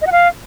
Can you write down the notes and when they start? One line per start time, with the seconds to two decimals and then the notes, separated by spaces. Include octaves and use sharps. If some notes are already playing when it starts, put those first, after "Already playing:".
0.02 D#5
0.07 F#5
0.12 F5